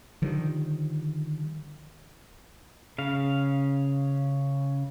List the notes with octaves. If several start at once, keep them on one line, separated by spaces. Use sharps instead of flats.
D3 D#3 F3 G3
C#3 F5